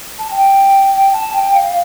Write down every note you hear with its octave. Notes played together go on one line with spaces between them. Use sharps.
A5
G5
A5
G5
F5